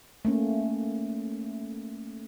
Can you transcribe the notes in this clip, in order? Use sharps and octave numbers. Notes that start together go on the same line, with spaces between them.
A3 A#3 C#4